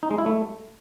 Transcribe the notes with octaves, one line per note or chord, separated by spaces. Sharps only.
D#4
G#3
E4
A3